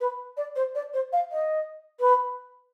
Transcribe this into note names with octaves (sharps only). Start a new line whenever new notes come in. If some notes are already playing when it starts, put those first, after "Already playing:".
B4
D5
C5
D5
C5
F5
D#5
B4